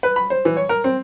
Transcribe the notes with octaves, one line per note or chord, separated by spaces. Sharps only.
B4
B5
C5
E3
C#5
A#4
C4